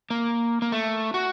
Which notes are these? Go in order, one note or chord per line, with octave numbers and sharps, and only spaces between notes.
A#3
A#3
A3
F#4